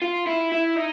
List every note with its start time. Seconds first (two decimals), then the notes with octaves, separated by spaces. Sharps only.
0.02 F4
0.27 E4
0.52 E4
0.76 D#4